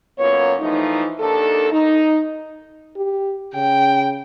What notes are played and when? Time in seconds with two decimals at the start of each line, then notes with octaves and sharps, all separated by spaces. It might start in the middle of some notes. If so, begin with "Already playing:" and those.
0.19 F#2 A#3 B3 F4 C#5
0.60 E3 F3 A3 D#4
1.19 D#2 D#3 D4 A4
1.71 D#4
2.96 G4
3.54 C#3 G5